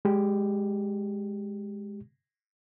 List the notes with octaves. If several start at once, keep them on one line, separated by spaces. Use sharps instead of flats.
G#3 G4